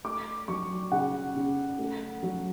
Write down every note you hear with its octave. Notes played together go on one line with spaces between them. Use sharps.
A3 D6
F#3 C#6
C#3 F#5
C#3
A3
F#3